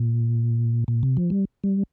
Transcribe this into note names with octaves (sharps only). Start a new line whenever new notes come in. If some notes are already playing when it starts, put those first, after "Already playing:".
Already playing: A#2
A#2
C3
F3
G3
G3